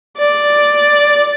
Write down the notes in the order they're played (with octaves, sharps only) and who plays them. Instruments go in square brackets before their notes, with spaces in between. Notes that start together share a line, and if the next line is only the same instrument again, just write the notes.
[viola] D5